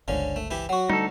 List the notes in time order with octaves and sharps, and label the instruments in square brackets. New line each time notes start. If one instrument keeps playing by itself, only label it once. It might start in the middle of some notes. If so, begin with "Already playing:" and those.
[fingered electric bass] G1 C#2 [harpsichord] D3 C#4 [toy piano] C5 C#5 F5
[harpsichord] A3
E3 E4 G4
[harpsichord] F#3 F#4 [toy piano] F#5 C#6
[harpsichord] D2 [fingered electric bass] G3 [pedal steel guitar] D#4 A4